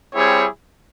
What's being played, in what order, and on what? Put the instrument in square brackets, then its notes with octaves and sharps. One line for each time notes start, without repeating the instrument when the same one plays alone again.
[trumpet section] G3 C4 E4 G#4 C#5